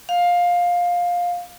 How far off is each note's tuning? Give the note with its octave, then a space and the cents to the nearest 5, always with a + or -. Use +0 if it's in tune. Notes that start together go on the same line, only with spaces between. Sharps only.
F5 +15